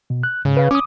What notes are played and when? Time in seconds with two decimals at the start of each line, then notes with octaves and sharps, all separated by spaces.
0.10 B2
0.23 F#6
0.45 G#2 C#3
0.57 B4 F5
0.71 C#4 D6 D#6